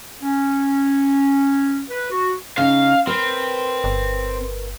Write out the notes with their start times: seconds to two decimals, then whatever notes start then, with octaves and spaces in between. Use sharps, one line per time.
0.23 C#4
1.90 B4
2.11 F#4
2.58 C#3 D#4 F5
3.07 C4 A#4 B4
3.84 G1